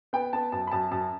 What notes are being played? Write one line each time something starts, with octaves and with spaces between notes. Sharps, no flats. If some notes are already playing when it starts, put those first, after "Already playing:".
B3 G5
B3 A5
F#2 A5
B5
F#2 A5
F#2 A5